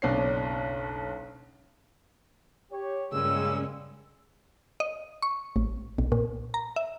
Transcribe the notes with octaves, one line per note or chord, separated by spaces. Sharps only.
F#1 B1 B2 D4 C#5 C7
G4 C#5
G2 A#2 C#3 G3 G#3 C#4 E6
D#5
C#6
A1
B1
A#2
A#5
E5